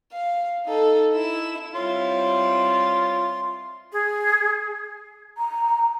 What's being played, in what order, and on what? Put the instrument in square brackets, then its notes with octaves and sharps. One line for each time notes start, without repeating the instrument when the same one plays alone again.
[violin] F5
D#4 A4
E4 E7
[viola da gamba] G3 C4 E4 [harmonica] F4 [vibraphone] C#5 [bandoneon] C6
[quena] G#4
[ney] A#5